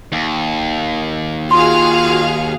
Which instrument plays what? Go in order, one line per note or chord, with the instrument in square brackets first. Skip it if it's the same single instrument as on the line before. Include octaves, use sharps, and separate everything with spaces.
[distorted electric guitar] D#2
[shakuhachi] F4 [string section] F#4 G#4 F5 [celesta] C6